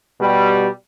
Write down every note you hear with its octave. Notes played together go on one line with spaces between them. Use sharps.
B2 G3